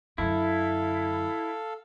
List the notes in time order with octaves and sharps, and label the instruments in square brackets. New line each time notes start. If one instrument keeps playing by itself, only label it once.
[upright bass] F#2 D3 [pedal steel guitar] E4 [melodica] A4 F5